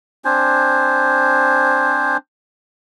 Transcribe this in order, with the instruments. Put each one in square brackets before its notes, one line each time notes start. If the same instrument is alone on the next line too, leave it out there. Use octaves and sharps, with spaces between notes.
[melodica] C4 D4 C5 G#5